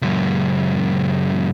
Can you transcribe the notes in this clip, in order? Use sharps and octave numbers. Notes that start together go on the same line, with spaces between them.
C#2 F#2